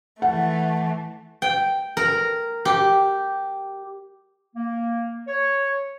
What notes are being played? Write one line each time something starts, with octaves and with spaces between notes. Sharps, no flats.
E3 A3 F#5
G5
A#4
G4
A#3
C#5